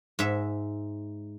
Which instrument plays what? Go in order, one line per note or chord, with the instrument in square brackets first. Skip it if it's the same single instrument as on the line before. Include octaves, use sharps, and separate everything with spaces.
[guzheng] G#2 E5